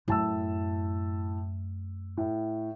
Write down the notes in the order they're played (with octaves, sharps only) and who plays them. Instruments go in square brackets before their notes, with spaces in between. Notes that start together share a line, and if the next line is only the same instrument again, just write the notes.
[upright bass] F#2 A3 [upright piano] A2 A5 E6
[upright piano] A2